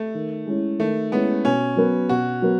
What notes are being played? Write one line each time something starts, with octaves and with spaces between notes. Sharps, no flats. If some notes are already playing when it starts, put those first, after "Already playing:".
Already playing: A3
D#3
G#3 C#4 E4
D#3 A3
G#3 B3 C#4 E4
B2 C#4
F#3 B3
B2 F#4
F#3 B3